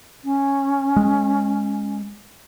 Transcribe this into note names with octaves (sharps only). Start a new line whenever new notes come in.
C#4
G#3